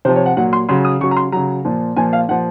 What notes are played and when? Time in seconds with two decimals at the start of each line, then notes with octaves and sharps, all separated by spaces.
0.05 C3 C5
0.09 F3
0.16 C#5
0.26 F#5
0.37 A#2 F#3 F#5
0.53 C6
0.69 C#3 F#3 C6
0.85 D#6
1.01 C#3 F#3 C#6
1.11 A#5
1.17 C6
1.32 C#3 F#3 A#5
1.65 A#2 F3
1.96 A#2 F3 G#5
2.13 F5
2.29 A#2 F3 F#5